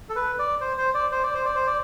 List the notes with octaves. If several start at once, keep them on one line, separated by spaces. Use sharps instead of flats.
A4
B4
D5
C5
C5
D5
C5
D5
C5
D5
C5
D5